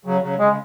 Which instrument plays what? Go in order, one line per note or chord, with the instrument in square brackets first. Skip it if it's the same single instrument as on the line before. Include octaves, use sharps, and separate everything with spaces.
[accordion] C#3 F#3
C#3 F#3
[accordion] C#3 [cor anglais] G#3
[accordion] C#3